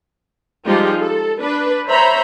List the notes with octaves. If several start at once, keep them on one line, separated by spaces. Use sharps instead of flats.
F3 G3 G#3 D#4 F4 G4
A4
D4 B4
C5 C#5 E5 A#5 B5